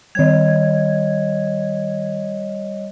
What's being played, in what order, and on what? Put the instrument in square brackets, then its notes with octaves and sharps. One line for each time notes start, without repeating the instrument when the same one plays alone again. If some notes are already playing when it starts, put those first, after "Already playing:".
[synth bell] D#3 G#6 [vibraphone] G3 C#5 D#5